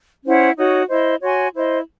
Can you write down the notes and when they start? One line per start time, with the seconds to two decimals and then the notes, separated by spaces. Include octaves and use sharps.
0.24 C#4 E4 C5 F#5
0.56 D#4 F#4 C#5
0.89 E4 C5 D#5
1.22 F#4 C#5 G#5 C6
1.54 E4 C5 D#5